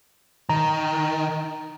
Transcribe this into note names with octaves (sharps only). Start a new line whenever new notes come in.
D#3 A#5